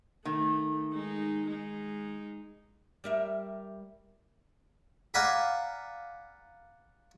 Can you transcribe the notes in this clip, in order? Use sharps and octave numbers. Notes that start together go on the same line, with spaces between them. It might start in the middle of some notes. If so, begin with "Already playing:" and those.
D#3 A3
G#3 D#4
G#3 D#4
G3 A#4 E5
D5 F5 F#5 G#5 A#5 B5